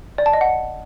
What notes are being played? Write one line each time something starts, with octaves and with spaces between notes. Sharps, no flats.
D5
A5
D#5
F#5